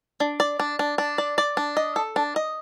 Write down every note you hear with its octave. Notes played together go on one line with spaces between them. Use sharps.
D4
D5
D4
D4
D4
D5
D5
D4
D#5
A4
D4
D#5